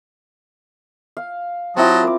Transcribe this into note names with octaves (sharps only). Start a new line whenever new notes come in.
F5
F#3 C4 E4 F4 D#5 A5
A#4 D6